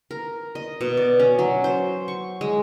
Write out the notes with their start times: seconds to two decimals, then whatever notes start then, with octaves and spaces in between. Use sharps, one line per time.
0.11 A#4
0.55 D#5
0.81 B2
0.97 D5
1.19 C#4
1.39 F#3
1.64 C5
2.08 C#6
2.41 G#3